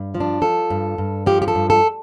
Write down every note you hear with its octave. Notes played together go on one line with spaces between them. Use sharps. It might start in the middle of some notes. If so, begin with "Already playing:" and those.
Already playing: G2
F3
D4
F3 A4
G2
G2
F3 G4
G4
A4
G2
A4